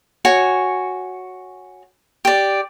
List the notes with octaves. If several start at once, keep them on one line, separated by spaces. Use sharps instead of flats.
F#4 C#5 G#5
G4 D5